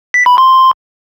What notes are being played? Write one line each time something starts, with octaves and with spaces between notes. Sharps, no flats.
B6
B5
C6